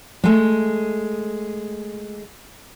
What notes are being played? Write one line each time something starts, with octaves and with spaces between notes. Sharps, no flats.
G#3 A3